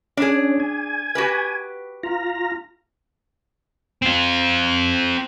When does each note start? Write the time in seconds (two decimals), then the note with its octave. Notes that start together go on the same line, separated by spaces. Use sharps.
0.17 C#4 D4 G#4
0.60 G#5
1.15 F#4 G4 B4
2.03 F4 A#5
4.02 C4 F4